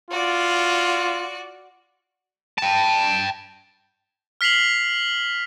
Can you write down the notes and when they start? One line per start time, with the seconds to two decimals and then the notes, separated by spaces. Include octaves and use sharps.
0.11 F4 F#4 D5
2.58 G5 A5
4.41 F6 B6 C7 F7 F#7